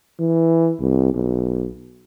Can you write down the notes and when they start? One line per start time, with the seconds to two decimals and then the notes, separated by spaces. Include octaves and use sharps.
0.19 E3
0.80 C2
1.14 B1